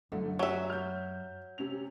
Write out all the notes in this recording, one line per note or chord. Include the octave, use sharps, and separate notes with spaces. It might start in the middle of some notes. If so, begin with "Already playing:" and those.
G1 F#2 D3 A3
F#3 F#4 G4 E5
F6 G6
C3 C#4 F7